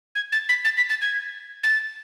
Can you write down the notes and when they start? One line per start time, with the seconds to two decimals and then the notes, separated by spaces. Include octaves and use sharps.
0.15 G#6
0.32 A6
0.49 B6
0.65 A6
0.77 B6
0.89 A6
1.02 G#6
1.63 A6